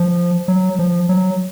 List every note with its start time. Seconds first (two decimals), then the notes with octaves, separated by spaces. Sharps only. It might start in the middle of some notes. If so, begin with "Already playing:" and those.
Already playing: F3
0.48 F#3
0.79 F3
1.09 F#3